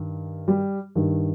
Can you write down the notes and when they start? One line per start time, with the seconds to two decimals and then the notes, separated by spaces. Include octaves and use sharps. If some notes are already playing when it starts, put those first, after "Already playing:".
Already playing: G2 D#3
0.48 G3 G4
0.95 G2 D#3